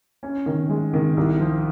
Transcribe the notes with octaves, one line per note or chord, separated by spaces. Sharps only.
C#4
D#3
G#3
D#3
C2
F3